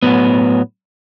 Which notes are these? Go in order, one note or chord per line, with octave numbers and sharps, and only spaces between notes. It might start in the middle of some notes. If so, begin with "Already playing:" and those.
A2 F#3 B3